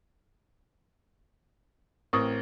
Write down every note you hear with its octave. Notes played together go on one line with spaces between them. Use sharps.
A1 C4 A#4 C#6 D#6